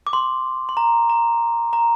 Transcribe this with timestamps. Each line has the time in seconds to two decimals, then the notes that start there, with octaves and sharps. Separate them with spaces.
0.07 D6
0.13 C6
0.69 C6
0.77 A#5
1.10 A#5
1.73 A#5